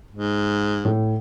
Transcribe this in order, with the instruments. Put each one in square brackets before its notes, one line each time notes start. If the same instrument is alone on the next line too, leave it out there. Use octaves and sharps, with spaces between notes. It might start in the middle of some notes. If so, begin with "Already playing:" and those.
[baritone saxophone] G#2
[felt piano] A2